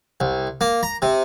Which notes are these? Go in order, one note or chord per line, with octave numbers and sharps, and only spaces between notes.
C2
A#3
A#5
C3